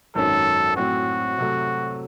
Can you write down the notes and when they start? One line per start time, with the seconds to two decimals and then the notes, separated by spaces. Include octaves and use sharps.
0.15 G#1 F#2 D#3 F#3 C#4 A4
0.77 A2 F#3 C4 F#4
1.38 C3 F#3 A3